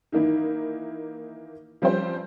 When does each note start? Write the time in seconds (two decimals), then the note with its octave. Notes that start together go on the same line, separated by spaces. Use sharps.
0.12 D#3 E3 A#3 D#4 E4
1.82 F3 G3 C4 C#4 F4 C5